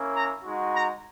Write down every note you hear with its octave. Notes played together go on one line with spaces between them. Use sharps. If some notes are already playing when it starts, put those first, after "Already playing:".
Already playing: A#3 C#4 E4
A#5
G#3 D#4 F#4
A#5